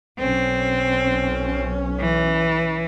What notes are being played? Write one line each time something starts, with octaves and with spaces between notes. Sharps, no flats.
B1 C4 C#4
E3